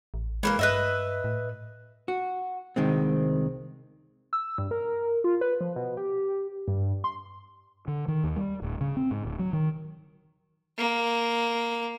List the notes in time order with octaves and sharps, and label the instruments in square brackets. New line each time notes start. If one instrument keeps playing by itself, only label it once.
[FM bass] A1
[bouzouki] E3 G3 A#3 [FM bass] G#3
[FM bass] G2 [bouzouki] B4 D#5 E5
[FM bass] A2
[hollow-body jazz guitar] F#4
C2 D#3 G#3 C4
[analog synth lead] E6
G2
A#4
F4
B4
F3
B2
G4
G2
C6
[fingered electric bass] D3
D#3
D#2
G3
D1
C#3
C4
G#2
D1
F#3
D#3
[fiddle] A#3